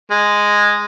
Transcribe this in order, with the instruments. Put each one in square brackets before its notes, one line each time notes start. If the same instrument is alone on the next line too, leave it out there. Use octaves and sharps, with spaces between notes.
[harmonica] G#3